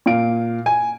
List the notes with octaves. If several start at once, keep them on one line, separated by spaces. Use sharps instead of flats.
A#2 F5 D7
G#5